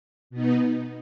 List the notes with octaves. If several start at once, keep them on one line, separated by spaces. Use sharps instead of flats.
B2 B3 D#4